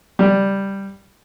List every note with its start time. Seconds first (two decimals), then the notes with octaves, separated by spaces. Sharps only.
0.19 G3